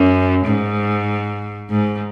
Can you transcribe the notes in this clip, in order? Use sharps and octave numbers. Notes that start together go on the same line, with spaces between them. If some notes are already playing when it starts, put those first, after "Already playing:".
Already playing: F#2
G#2
G#2